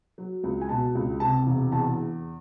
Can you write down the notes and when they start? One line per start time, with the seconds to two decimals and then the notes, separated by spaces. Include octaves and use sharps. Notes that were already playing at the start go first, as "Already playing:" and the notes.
0.18 F#3
0.44 C#2
0.61 G#5
0.69 B2 A5
0.95 C#2
1.20 C3 A5
1.46 E1
1.72 E2 A5